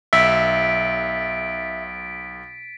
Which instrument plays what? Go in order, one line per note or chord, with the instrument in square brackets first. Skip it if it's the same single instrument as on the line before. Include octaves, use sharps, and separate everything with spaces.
[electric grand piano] B1 [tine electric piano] E5 [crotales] A6 B6 D7